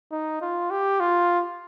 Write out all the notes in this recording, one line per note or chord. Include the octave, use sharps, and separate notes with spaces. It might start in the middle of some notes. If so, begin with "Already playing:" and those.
D#4
F4
G4
F4